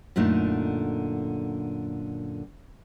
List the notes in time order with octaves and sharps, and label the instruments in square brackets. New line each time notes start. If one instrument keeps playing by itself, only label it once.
[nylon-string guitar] F#2 A#2 D3 A3 D#4